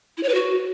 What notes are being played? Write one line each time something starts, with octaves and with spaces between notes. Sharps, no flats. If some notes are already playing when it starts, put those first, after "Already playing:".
E4
C#5
B4
F#4